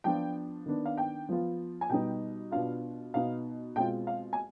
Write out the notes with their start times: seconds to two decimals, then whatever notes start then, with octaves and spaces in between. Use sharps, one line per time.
0.04 F3 B3 D4 F4 G5
0.66 D#3 B3 D4
0.85 F5
0.97 G5
1.29 F3 B3 F4
1.81 G#5
1.89 B2 G3 B3 D#4 G5
2.51 B2 B3 D4 F4 F5
3.14 B2 B3 D#4 F5
3.76 B2 G#3 C4 F4 G5
4.07 F5
4.33 G#5